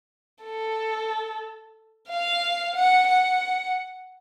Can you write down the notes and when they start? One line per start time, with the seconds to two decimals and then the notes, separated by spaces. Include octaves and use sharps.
0.44 A4
2.09 F5
2.75 F#5
3.08 F#5